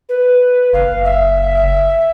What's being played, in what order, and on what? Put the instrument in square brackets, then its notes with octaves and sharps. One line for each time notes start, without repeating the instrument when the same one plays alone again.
[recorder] B4
[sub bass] F#1 [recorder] F5
[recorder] E5